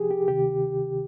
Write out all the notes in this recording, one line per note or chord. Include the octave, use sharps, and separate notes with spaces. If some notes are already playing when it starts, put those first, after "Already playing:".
Already playing: C2 C3 F3 G4 G#4
G4
D2 C3 D#3 G4